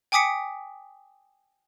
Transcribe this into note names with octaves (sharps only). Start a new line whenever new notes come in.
G5 G#5 D6 D#6 B6 C#7